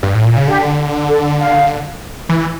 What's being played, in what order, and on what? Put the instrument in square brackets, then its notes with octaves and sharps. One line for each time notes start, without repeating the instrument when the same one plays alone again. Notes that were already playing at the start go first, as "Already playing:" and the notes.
[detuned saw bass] G2
A2
A#2
C#3
[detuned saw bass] D3 [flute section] G4
[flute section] A4
F5
[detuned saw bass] E3